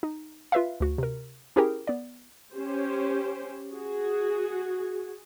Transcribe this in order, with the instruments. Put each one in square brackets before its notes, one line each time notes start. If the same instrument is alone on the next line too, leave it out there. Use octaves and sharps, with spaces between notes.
[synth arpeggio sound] D#4
F4 B4 E5 F5
D2 F#4
C3 A#4
C#4 E4 G4 G#4 A#4 G5
B3 D5
[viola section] C#4 G4 C5
F#4 G#4